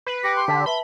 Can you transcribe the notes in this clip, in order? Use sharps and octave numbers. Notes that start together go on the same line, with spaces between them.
B4 C7
G4 A#6 C#7 D7
C6
D3 A5 C6 B6
B4 E5 A5 B5 G7